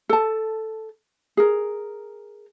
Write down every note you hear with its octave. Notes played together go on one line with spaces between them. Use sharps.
A4 A5
G#4 A#4